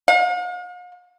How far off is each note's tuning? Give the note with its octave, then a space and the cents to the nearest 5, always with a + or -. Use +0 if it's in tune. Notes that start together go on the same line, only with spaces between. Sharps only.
F5 +45